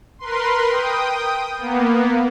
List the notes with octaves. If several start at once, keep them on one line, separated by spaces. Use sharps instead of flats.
A#4 B4 C6
G5 D#6
A#3 B3